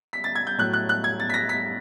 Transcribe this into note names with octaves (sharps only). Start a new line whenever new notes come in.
B6
A6
G#6
G6
A2 F#3 F#6
F#6
F#6
G#6
A6
B6
A#6
B6